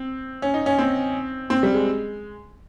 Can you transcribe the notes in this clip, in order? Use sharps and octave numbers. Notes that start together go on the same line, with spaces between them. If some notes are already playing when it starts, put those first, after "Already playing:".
Already playing: C4
C#4
D#4
C#4
C4
C4
G3
G#3